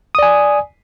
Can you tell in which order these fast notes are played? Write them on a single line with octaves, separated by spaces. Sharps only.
D#6 D5 G#5